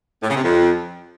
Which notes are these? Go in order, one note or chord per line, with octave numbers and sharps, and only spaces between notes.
A2
C#3
C3
F2